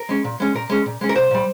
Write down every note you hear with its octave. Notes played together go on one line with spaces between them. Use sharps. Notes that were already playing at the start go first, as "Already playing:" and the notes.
Already playing: A#4
G#3 C#4
A#2
G#3 C#4
A#2 A#4
G#3 C#4
A#2
G#3 C#4
A#4
C2 C5
A#2 G3